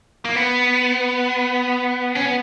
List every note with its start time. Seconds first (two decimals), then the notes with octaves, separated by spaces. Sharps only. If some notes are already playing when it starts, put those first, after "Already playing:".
0.25 A#3
0.36 B3
2.15 C#4
2.25 B3